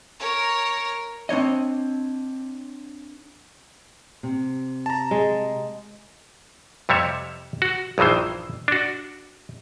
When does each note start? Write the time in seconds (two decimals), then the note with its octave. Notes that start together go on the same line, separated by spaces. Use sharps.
0.20 A#4 C#5
1.29 C4 D4 C#5 D#5
4.23 C3
4.86 A5 A#5
5.11 G#3
6.89 F2 C3 G3 C#5 E5
7.62 F#4
7.98 A#1 G2 D#3 E3 C5
8.68 D4 F#4